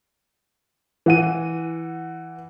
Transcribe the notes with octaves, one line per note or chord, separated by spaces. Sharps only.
E3 F#5 D#7